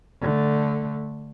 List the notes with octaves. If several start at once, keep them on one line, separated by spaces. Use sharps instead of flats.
D3 A3